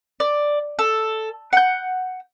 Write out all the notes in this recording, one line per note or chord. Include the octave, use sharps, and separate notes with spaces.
D5
A4
F#5 G6